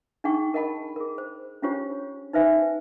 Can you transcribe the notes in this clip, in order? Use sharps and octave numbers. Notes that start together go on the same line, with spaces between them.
D4 D#4 G#4 F#5 G5 C#6
A#4 D#5 F#5 A5 B5
G#4 A#4
C5
C#4 D4 F4 G4 C5 C#5
D#4 B4 C5 E5 G#5